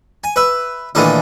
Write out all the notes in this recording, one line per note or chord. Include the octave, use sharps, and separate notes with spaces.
G#5
B4 E5
A#2 D#3 E3 A3 D4 E4